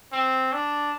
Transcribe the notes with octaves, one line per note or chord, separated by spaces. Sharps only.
C4
D4